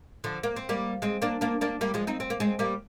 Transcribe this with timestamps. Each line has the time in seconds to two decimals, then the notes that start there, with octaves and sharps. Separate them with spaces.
0.24 D3 F3
0.43 A#3
0.56 C4
0.69 G3 A#3
1.02 G#3 C4
1.22 A#3 D4
1.41 A#3 D4
1.61 A#3 D4
1.81 G3 A#3
1.94 F3 G#3
2.07 C4 D#4
2.20 C4
2.30 A#3
2.40 G#3 C4
2.59 G3 A#3